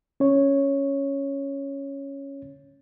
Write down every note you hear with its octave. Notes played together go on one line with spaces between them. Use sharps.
C#4 C#5